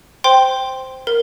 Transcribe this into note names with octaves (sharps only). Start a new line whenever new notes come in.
C5 G5 C6
A#4